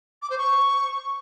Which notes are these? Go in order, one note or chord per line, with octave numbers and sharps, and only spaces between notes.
D6
C5
C#6